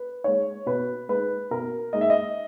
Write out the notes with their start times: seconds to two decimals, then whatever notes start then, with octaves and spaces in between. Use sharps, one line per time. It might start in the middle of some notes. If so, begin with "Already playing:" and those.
Already playing: B4
0.24 G#3 D#4 C#5
0.66 B2 B4
1.09 G#3 D#4 B4
1.51 B2 A#4
1.93 G#3 D#4 D#5
2.01 E5
2.10 D#5